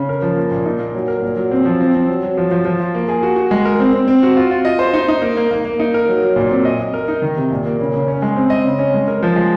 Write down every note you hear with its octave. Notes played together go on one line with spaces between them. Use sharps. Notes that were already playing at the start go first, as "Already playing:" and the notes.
Already playing: C#3
A#4
F3
A#3
A#2
D#4
A#3
F#3
A#4
A#2
F#3
C4
F3
C4
C4
F#3
F#3
F3
F3
F3
F4
A#3
G#4
F#4
F#4
G#3
A#4
C4
C4
C4
F#4
F4
F4
D#5
C5
D#4
D#4
A#3
A#3
A#3
A#3
D#4
A#4
F#3
F#3
A#2
C4
D#5
D#5
A#4
D#4
D#3
C3
A#2
A#3
C#3
C#3
C#4
G#3
C4
D#5
C#3
C#4
G#3
A#4
F3
G#3